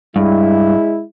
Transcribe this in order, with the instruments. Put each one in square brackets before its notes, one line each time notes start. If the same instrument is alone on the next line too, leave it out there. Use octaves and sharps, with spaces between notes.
[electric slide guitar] G2 [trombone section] G#3 E4